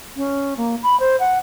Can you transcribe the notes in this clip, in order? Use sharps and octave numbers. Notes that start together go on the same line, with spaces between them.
C#4
A#3
B5
C5
F#5